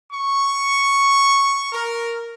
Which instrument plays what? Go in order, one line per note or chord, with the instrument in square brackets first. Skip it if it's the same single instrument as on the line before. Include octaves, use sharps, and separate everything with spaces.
[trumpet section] C#6
A#4